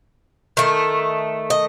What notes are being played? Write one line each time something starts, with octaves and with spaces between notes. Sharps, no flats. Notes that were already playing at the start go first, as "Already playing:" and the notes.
D#3 A3
D#5